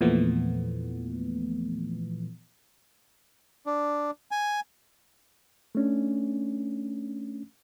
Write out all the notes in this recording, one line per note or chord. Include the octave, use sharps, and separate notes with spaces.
E2 A#2 E3 F3 A3 B3
D4
G#5
A3 C#4 D4